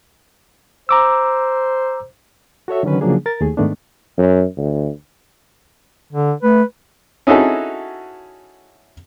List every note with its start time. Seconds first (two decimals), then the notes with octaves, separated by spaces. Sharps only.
0.89 C5 A#5 D6 E6
2.68 F#4 A4 C#5 E5
2.83 D3 D#3 F#3 C#4 B4
3.01 C#3 F3 F#3 A#3 D4 G#4
3.26 A#4 A6
3.41 D#2 A3 G#4
3.57 G#2 D#3 A3 B3 D4
4.18 F#2
4.58 D2
6.12 D3
6.43 A3 B4
7.27 C#4 D#4 E4 F#4 G#4 A4